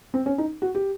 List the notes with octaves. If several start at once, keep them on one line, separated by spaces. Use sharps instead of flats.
C4
C#4
D#4
F#4
G4